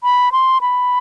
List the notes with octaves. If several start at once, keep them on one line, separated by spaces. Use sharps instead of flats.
B5
C6
B5